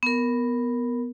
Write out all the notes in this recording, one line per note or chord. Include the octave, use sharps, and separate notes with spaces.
B3 A#4